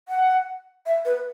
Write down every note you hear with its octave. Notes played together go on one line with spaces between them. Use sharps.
F#5
E5
B4